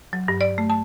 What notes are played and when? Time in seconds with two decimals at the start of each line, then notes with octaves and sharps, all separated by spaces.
0.13 F#3
0.28 G2
0.41 D5
0.58 A3
0.70 A5